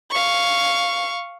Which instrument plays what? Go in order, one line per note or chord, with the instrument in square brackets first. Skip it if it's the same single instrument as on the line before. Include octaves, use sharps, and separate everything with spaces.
[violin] F5 C#6